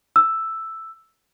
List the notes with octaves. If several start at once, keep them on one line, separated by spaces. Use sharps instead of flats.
E6